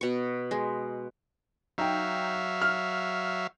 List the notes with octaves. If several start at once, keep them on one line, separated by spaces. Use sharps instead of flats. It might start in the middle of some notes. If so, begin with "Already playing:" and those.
B2 C#6
G#3
F#3 D#4 E5 F5 G5
F6